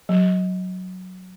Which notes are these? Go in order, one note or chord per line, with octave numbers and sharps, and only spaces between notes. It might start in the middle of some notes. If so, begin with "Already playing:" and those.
F#3